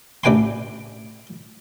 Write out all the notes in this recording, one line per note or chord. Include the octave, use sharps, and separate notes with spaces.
A1 D4 B4 G5 G#5 C6